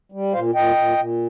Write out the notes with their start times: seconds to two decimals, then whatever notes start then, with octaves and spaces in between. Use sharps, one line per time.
0.12 G3
0.33 A#2 C5 F5
0.55 A#2 D#5 G5
0.76 A#2
0.98 A#2